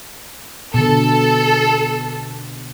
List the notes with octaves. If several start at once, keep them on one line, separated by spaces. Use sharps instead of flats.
B2 D3 A4